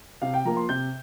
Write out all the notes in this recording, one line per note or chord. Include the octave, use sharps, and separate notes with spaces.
C3 F5
G5
F3 A#3 A#5
C6
C3 G6